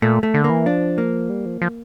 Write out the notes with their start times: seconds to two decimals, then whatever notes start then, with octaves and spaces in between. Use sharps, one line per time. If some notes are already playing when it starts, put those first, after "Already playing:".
0.02 A#2 A3
0.23 A3
0.34 D3
0.44 A#3
0.50 E3
0.66 F3 D4
0.98 A#3
1.30 G3
1.46 F3
1.62 F3